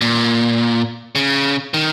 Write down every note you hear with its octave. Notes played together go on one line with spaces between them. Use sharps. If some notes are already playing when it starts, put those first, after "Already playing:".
A#2
C#3
D#3